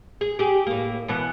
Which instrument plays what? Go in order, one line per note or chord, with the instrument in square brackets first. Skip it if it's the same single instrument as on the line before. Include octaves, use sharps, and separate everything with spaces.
[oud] G#4
G4 G#4
A2 A#3
B2 E3 B3